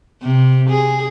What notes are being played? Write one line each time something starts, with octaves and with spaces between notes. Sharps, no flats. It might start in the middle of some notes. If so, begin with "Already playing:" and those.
C3
G#4